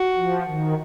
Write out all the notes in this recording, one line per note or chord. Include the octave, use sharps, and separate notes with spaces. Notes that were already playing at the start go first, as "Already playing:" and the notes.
Already playing: F#4
F3
D#3